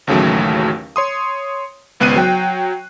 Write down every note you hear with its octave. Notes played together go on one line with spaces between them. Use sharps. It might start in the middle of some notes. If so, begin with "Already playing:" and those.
A1 D#2 C#3 F#3 A3
C#5 C6 D#6
G#1 C#2 B3 F#6 C7 D#7
F#3 G5